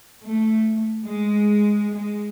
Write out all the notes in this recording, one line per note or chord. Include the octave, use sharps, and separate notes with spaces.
A3
G#3
G#3